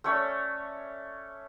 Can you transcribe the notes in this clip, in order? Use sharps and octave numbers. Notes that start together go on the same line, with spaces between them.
A3 C#4 C#5 D5